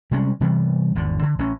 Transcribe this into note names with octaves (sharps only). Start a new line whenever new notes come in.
C3 G3 G#3 C#4
C3 E3 G3 B3
G#1 E2 D3
D3
A1 C#4